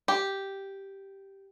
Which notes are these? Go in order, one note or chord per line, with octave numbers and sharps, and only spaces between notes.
G4